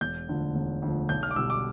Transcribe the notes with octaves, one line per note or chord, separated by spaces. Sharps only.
E1 G6
D2 D3 F3
E1
D2 D3 F3
B1 G6
F6
D6
B2 G3 E6
D6